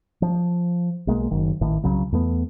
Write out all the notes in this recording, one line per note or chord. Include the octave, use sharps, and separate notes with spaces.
F3
B1 G#3 A#3
F#1 D#3
A1 A2 D#3
C2 C#3 F#3
E2 A3 B3